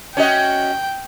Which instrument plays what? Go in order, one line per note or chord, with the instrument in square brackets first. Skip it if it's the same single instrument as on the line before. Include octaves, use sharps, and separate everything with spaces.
[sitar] C#4 F#4 D#5 [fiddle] G5